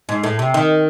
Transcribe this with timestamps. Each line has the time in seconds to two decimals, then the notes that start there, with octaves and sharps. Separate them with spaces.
0.09 G#2
0.24 A2
0.39 C3
0.54 D#3